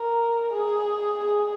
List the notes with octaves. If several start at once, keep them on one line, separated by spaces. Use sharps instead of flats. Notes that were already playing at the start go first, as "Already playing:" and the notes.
Already playing: A#4
G#4
G#4